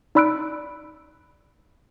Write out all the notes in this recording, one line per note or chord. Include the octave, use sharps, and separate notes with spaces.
D#4 D5 B5 E6 F#6 D7